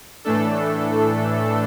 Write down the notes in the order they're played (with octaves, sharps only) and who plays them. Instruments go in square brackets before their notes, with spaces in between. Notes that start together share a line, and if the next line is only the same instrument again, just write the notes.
[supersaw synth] A2 E3 A3 D4 A4